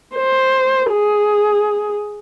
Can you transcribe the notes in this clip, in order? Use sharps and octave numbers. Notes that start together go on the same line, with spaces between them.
C5
G#4